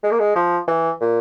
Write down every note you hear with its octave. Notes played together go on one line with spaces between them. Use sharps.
G#3
A#3
G#3
F3
E3
A#2